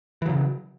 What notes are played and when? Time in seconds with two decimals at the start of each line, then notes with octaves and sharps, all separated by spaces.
0.22 E3
0.26 F#3
0.29 C#3